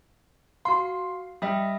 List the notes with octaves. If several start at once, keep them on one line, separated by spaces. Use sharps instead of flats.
F#4 F5 C6
G3 D#5 E5 D#6